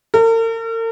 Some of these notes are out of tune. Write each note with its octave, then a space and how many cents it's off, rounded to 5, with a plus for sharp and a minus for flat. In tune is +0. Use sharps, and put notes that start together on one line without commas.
A#4 -45